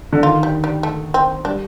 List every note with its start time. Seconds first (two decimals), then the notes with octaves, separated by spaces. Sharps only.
0.13 D3
0.23 D#3 F4
0.43 G3
0.64 G3
0.83 A3
1.14 C4
1.45 G3 D4